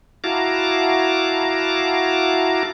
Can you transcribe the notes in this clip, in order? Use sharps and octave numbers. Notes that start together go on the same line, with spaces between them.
E4 F#4 F5 A5 A#5 D6